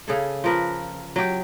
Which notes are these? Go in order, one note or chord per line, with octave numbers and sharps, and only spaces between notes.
C#3 G#4 A4
F3 A#4 B4
F#3 G4